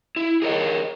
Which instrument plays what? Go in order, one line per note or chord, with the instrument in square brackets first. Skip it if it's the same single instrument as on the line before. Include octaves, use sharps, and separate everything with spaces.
[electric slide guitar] E4
G#4 A#4 C#5 D#5